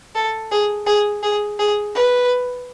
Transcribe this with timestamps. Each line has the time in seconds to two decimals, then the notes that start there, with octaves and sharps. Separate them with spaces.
0.15 A4
0.51 G#4
0.86 G#4
1.23 G#4
1.59 G#4
1.95 B4